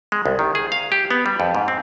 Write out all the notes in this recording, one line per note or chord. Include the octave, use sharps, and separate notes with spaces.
G#3
C2
D#3
G#4
F5
G4
B3
G3
F2
G#2
C4